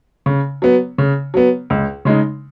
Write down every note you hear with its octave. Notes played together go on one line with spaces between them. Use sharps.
C#3
F#3 B3
C#3
F#3 B3
C#2
C#3 G#3 D#4